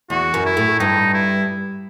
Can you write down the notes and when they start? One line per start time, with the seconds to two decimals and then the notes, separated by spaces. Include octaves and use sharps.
0.10 E2 F#4
0.34 F#2
0.45 E4
0.57 A2
0.79 G2 D#4
1.14 E4